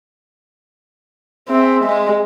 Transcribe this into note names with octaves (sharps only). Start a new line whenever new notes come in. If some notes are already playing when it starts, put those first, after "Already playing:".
C4 G#4 E5
G#3